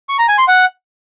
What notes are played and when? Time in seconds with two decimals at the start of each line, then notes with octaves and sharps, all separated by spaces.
0.09 C#6
0.19 A#5
0.28 G#5
0.38 C6
0.48 F#5